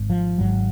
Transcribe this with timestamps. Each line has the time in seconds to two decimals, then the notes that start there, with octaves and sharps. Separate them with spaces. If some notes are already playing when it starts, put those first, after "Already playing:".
Already playing: G#1 G#2
0.10 F3
0.38 G#1 G#2 F#3